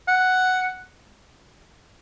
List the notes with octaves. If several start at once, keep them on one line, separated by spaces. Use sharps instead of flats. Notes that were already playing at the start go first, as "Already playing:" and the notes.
F#5